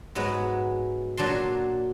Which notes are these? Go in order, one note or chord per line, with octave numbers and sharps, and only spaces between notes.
G#2 F#3 G#3 B3
A#2 F#3 D4 A5 C6